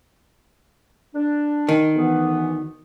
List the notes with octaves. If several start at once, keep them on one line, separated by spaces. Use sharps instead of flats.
D4
D#3
D2 E3 B3